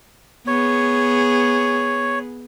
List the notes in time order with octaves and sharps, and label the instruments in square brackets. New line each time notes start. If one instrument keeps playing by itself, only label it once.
[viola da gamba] B3 G#4 [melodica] C#5